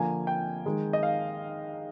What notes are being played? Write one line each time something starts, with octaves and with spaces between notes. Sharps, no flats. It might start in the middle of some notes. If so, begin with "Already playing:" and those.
Already playing: D3 F3 A#3 G#5
G5
D#3 G#3
D#5
F5